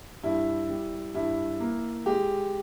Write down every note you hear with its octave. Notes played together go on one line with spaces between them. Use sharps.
G2 E4
G3
G2 E4
A#3
G#3 G4